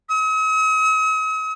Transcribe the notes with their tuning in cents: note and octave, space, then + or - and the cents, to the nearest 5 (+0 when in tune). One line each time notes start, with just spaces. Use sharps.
D#6 +45